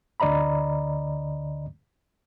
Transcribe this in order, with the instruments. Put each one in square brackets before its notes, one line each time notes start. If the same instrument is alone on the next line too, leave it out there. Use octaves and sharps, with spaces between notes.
[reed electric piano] D2 D3 D5 D#5 A#5 B5